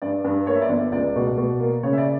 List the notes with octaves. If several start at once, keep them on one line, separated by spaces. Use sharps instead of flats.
G2 D5
G2
A#3 C#5
E5
D5
G1
C#2 D5
B2
B2
A#3
C#3 C#5
E5
D5